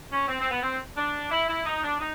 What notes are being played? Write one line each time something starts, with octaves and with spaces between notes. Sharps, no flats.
C#4
C4
C4
B3
C4
D4
E4
E4
D#4
D4
D#4